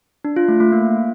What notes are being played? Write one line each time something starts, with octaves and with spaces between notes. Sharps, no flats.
D4
F4
A3
A3
A#3